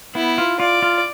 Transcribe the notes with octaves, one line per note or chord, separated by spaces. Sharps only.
B3 E4
F4
F4 D5
F4